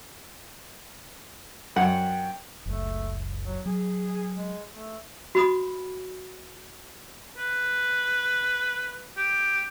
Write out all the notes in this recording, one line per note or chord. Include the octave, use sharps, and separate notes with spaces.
F#2 F#5 G5
F#1 C#2 A3
F#3
F#3 G#4
G#3
A3
F#4 B5 D#6
B4
G4